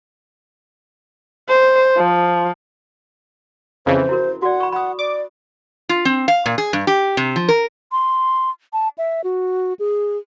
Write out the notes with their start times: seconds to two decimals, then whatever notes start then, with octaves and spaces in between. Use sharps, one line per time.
1.50 C5
1.97 F3
3.86 F2 C#3 E3 C5
4.09 E4 F#4 A#4
4.42 F#4 D5 F#5
4.60 B5 C#6
4.72 F#5 B5 D#6
4.99 D5 D6
5.89 F4
6.05 C4
6.28 F5
6.46 A#2
6.58 G#4
6.73 G2
6.87 G4
7.17 C3
7.36 F3
7.49 A#4
7.92 C6
8.73 A5
8.98 E5
9.24 F#4
9.79 G#4